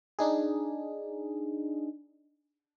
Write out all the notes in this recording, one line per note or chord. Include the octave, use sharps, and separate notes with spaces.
D4 D#4 G#4